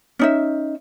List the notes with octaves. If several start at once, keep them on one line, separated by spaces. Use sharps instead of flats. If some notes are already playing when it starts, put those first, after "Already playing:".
C#4 D#4 E5